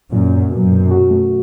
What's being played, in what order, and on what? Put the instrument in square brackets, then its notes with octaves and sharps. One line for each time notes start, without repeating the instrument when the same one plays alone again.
[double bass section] F#2 [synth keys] A#2
[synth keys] A#2
[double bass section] F#2 [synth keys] B2
[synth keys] B2
F#4
A3